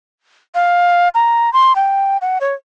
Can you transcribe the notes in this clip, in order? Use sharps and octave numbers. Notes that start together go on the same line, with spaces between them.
F5
A#5
C6
G5
F#5
C#5